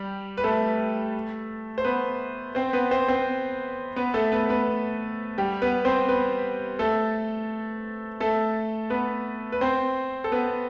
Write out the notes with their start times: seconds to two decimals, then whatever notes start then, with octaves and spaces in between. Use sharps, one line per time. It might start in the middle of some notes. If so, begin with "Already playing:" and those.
Already playing: G3 G4
0.37 B4
0.44 A3 A4
1.78 C5
1.84 B3 B4
2.55 C4 C5
2.73 B3 B4
2.91 C4 C5
3.08 C4 C5
3.96 B3 B4
4.14 A3 A4
4.32 B3 B4
4.49 B3 B4
5.38 G3 G4
5.62 B3 B4
5.85 C4 C5
6.09 B3 B4
6.79 A3 A4
8.20 A3 A4
8.90 B3 B4
9.52 B4
9.61 C4 C5
10.24 A4
10.32 B3 B4